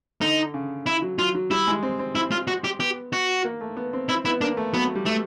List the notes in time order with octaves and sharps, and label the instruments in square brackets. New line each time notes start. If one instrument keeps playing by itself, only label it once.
[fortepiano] D3 [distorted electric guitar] D#4
[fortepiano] C#3
[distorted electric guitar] E4
[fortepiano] F#3
[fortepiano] F#3 [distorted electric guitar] F4
[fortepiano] F#3
[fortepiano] G3 [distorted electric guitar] E4
[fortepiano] G#3
C4
C4
[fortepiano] C4 [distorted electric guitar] E4
[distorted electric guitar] F4
F#4
G4
[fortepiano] B3 [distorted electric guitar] G4
[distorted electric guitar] F#4
[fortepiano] A#3
A3
B3
C4
[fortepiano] C4 [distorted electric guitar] E4
[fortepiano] B3 [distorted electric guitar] E4
[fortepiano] A#3 [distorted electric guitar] D4
[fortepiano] A3
[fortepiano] F#3 [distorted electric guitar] B3
[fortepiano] G3
[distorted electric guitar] A3